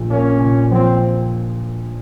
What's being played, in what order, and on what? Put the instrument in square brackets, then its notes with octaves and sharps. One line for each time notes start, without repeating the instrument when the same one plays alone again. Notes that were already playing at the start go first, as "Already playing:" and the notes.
Already playing: [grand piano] A#1 A#2
[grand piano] A#3 [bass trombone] C#4
[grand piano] A#2
[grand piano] F3 [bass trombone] C4